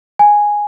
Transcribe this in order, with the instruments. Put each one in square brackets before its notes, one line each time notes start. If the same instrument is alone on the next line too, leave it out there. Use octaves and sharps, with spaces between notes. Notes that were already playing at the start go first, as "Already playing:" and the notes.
[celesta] G#5